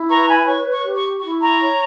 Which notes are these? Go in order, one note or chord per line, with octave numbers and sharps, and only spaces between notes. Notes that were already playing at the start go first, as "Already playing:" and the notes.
Already playing: E4
B4 A#5 C#6
G#5 B5
C#5 C#6
C#6
G4
C#6
E4 C#6
A#5 C#6
C#5